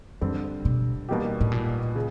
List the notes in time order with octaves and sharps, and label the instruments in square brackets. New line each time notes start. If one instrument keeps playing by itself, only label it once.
[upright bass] F#2 [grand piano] D3 G3 C4
[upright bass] B2
[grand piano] B2 G3 A#3 D#4 G4
[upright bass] A2
A#2
[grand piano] C#3